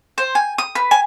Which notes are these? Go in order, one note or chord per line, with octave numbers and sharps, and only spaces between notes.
C5
G#5
D#6
B4
G#5